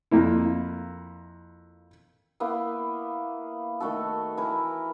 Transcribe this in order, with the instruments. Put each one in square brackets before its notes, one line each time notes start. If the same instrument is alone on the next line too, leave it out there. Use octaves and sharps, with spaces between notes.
[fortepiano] F2 A#3 E4
[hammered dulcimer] A#3 B3 E4
D#3 A3 F#4 A4
E3 E4 A#4